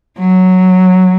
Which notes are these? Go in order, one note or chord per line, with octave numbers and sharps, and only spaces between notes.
F#3